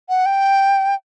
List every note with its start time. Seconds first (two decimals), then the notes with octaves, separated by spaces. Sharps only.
0.09 F#5
0.26 G5